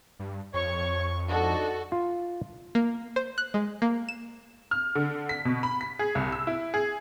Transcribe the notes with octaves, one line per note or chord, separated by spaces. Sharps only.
G2
F2 C#5 C#6
G#2 D4 D#4 F#4 A4
F4
A#3
C5
F#6
G#3
A#3
E7
F6
D3
B6
B2
B5
B6
G#4
C2
E6
E4
G#4